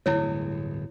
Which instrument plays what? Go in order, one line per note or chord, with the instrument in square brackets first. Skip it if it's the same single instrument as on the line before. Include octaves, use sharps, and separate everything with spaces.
[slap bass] D1 G1 E2 [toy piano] E4 C#5